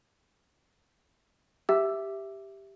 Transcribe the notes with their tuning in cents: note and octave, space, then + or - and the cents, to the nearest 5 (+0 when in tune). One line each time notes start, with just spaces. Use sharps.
G4 +0 E5 +0 E6 +15